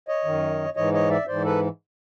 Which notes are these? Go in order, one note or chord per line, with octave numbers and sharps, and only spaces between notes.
C#5 D#5
F#2 D#3
G#2 E3 C#5 D#5
C#5 D#5
D5 E5
G#2 E3 C5 D5
A4 B4